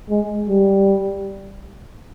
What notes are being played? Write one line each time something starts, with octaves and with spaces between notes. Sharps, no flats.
G#3
G3